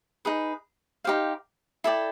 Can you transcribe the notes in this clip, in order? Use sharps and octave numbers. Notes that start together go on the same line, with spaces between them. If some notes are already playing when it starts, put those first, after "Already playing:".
D#4 G#4 B4
D#4 G4 C5 F5
E4 A4 D5 G5